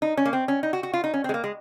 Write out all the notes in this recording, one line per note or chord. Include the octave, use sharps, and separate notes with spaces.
D#4
C#4
A#3
C4
C#4
D#4
F#4
F#4
F4
D#4
C#4
C4
G#3
A#3
G#3